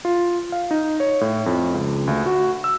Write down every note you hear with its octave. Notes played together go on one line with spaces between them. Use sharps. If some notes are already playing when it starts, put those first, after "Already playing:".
F4
F5
D#4
C#5
A2
F2
C#2
D2
F#4
E6